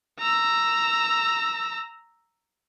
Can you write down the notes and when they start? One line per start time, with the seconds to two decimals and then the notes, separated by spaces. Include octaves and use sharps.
0.20 A#5 E6